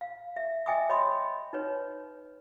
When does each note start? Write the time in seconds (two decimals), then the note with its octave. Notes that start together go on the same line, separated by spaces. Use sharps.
0.01 F5
0.36 E5
0.66 D#5 E5 G5 G#5 D6 D#6
0.89 C#5 D#5 B5 C6 D6 D#6
1.53 D#4 B4 C#5